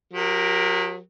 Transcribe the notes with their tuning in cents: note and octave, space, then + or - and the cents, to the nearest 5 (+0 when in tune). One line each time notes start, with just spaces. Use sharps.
F#3 -40 G4 +0 A#4 +0